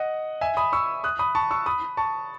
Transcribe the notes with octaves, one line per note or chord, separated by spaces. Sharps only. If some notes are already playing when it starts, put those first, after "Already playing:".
Already playing: D#5 F#5
E5 G#5
B5 D#6
C#6 E6
D#6 F#6
B5 D#6
A5 C#6
C#6 E6
B5 D#6
A5 C#6